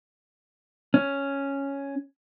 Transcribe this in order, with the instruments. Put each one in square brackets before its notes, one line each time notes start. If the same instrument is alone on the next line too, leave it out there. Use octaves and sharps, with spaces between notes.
[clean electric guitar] C#4